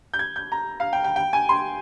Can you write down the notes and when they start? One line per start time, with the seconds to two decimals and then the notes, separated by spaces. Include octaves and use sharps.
0.14 G6
0.19 G#6
0.36 G6
0.52 A#5
0.80 F5
0.93 G5
1.04 G5
1.16 G5
1.33 G#5
1.49 C6